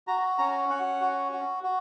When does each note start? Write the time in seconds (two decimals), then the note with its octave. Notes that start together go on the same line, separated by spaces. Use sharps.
0.07 F#4 A#5
0.38 C#4 A#5
0.69 C#4 F#5
1.01 F#4
1.32 F#4
1.63 F#4